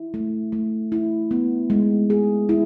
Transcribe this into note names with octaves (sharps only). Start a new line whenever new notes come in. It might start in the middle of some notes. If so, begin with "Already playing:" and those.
Already playing: E4
A3
A3
E4
B3
G#3
G#4
E4